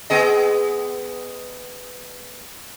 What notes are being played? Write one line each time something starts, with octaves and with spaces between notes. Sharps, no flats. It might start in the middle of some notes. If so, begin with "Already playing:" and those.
B3 G#4 D#5